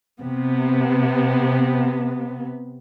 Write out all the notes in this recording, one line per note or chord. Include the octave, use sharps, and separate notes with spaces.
C3 B3